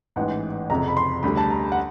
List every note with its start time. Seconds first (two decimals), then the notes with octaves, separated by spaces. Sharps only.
0.16 A1 G#2 E3 F#5
0.70 F#1 F2 C3 A#5
0.88 B5
0.97 C6
1.23 D2 D3 G3 B5
1.37 A5
1.50 A#5
1.72 F#5